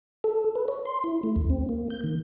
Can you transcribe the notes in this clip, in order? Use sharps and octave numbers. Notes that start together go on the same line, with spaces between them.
A4
B4
C#5
C6
E4
A3
D#2
C4
A#3
G6
D#3